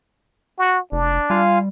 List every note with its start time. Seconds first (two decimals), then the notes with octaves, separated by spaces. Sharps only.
0.58 F#4
0.92 F1 D4
1.30 G3 F4 F5 G#5